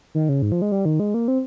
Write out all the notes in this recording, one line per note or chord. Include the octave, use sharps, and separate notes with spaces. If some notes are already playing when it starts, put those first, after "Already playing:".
D#3
C#3
G#2
F3
G#3
G3
D#3
G#3
A#3
C4